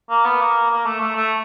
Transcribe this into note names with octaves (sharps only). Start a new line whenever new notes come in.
A#3
B3
A#3
A#3
A3
A3
A3